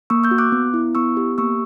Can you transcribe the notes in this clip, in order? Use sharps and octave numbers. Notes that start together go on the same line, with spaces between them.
A#3 C#6 E6
E6 G6
F#4
D6 F#6
B3
E4
B3 C#6 E6
G4
A#3 C#6 E6